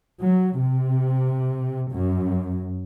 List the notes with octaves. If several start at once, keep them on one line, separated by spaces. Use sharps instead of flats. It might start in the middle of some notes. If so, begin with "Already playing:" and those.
F#3
C3
F#2